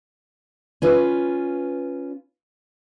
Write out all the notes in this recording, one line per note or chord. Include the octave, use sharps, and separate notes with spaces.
C#4 F4 B4